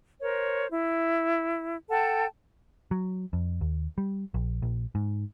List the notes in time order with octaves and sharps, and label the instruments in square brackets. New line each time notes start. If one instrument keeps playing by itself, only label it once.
[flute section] A#4 C5 C#5
E4
A4 F#5 G5 A5
[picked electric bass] F#3
F2
D#2
G3
A#1
A#1
G#2